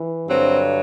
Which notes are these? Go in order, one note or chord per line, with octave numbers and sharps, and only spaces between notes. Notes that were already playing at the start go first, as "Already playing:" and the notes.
Already playing: E3
G2 D3 F#3 C4